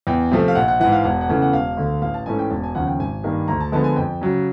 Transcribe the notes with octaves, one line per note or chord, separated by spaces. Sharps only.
E2 G5
C3 F3 A3
F5
A#1 F#5
F#5
G#2 E3 F#5
F5
E1 F#5
F#5
E2 C#3 E3 A3
F#5
E1 F5
D2 D3
A1 F5
A5
G#2 E3 A3 C#4 G#5
G5
E1 A5
G#5
D#2 C#3 F3 F#5
G5
G#1 G#5
G2 D#3 G3 A#3
D2 A#5
A5
D3 F3 G#3 B3 A5
G#5
F2 G5
C#3 F#3